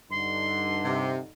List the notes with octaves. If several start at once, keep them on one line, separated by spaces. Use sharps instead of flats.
G2 D3 D#4 C6
C3